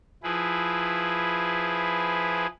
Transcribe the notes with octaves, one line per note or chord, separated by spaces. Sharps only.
F3 E4 G#4 B4